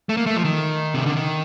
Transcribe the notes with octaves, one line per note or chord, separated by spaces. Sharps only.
A3
A#3
A3
F3
D#3
C3
D3
D#3